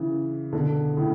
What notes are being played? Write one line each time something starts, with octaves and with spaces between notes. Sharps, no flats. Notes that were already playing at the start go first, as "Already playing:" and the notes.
Already playing: C#3 E3
B2 D3
A2 C#3